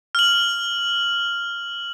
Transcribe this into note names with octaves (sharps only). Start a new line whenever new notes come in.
F6 F#7